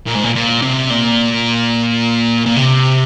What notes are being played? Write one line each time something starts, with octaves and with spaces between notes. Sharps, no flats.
A#2
G#2
A#2
A#2
C3
A#2
A#2
C3